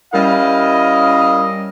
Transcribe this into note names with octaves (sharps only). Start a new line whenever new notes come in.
G3 C#4 E4 A#4 D#5 F5